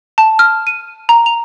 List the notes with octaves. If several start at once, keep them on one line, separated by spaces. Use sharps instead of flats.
A5
F6
D#7
A#5
F7